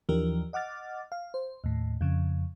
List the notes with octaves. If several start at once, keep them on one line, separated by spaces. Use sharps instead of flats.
D#2 E3 F3 D4 G4 A#4
D#5 F#5 D6 F6 A6
F5
C5
D#2 A2
F2 C#3